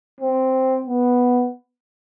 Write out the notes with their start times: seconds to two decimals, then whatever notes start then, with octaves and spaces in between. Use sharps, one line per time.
0.21 C4
0.87 B3